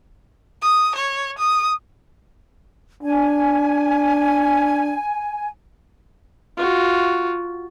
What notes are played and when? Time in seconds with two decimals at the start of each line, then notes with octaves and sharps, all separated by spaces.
0.62 D#6
0.95 C#5
1.38 D#6
3.03 D4 G#5
6.57 F4 F#4